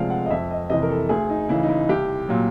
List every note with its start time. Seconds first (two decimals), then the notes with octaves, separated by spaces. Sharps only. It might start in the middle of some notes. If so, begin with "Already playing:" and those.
Already playing: D2 C3 F3 G#3 D5 F5
0.10 F#5
0.26 D#5
0.30 F2 E5
0.51 D#5
0.70 C3 E3 D#5
0.83 A#4
0.90 A4
1.09 D2 G#4
1.29 D#4
1.49 C#3 E3 E4
1.63 D#4
1.69 E4
1.89 C2 G4
2.29 A#2 F#3